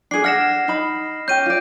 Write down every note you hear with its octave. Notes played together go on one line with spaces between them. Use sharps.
D4 G#4 C7
D4 F#5 F6 A#6 E7
D#4 B5
C#4 G4 G6 D#7
F4 D5